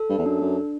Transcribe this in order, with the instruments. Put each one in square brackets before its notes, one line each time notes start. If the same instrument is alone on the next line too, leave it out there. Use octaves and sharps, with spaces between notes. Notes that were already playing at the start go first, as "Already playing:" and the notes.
Already playing: [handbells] A4
[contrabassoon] G2
E2
[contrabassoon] F#2 [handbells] D4
[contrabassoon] F#2
[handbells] D4